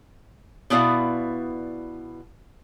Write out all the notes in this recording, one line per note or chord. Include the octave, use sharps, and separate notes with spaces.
B2 B3 E4 D5 F5